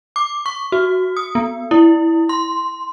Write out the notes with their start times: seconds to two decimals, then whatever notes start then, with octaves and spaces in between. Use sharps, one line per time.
0.16 D6
0.46 C#6
0.72 F#4
1.17 D#6
1.35 B3
1.71 E4
2.29 C6